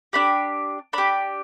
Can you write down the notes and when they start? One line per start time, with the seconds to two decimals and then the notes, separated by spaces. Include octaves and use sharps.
0.13 D4 G4 B5
0.93 D4 G4 B5